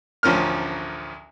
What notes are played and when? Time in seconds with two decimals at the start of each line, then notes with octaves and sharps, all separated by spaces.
0.23 A1 D2 F3 C#4 A#4 F6